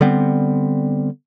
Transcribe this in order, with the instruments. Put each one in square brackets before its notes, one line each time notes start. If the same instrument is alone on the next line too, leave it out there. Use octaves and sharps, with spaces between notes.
[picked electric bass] D3 G3 B3 C4